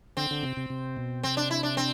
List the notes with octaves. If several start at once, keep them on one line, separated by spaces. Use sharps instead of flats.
D3 C4
D3
C3
C3
C3
B2
C3 C4
D4
E4
D4
C4